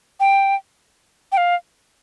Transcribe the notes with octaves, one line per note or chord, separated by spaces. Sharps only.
G5
G5
F5